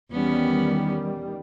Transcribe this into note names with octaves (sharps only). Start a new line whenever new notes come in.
E2 D#3 G3 B3 C#4